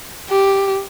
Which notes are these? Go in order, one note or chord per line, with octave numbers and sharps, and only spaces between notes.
G4